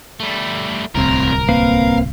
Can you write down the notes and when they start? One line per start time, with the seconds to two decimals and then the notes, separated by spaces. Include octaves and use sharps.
0.20 G3 A3
0.95 D1 C2 A2 C4 A#4
1.49 A#3 C4 B4 F5